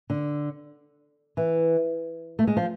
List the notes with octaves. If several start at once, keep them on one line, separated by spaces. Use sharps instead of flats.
D3
E3
A3
G#3
F3